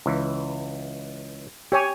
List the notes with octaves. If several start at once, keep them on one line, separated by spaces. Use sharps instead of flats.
C#2 E3
G4 C#5 G#5